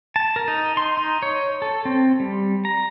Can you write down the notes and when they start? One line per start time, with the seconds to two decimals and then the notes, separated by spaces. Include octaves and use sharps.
0.16 A5
0.36 A#4
0.48 D#4
0.77 C6
0.97 D#4
1.23 C#5
1.62 A4
1.85 C4
2.20 G3
2.65 A#5